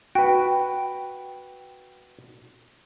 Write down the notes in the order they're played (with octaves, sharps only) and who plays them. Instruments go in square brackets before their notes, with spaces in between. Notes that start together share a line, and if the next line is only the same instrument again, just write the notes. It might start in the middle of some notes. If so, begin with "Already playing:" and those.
[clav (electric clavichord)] F#4 B4 [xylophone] G5